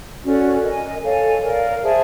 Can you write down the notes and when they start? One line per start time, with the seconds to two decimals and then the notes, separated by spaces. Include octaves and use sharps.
0.23 C#4 F#4 A4 D5
0.63 A#4 D#5 G#5
1.02 A4 C#5 F5 G#5
1.42 A#4 D5 F5
1.82 G#4 C5 E5 A5